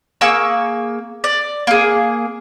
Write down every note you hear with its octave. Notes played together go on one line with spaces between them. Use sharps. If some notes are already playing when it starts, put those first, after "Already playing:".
A#3 G#4 C#6 E6
D5
A#3 G#4